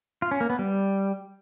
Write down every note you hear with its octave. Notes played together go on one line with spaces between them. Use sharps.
F4
C#4
A#3
B3
G3